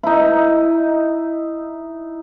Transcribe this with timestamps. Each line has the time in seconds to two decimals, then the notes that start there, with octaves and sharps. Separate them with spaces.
0.03 D#4 E4